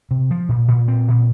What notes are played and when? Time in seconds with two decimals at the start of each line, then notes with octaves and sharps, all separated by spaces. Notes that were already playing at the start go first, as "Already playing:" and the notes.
0.11 C3
0.31 F3
0.49 A#2
0.68 A#2
0.88 C4
1.08 A#2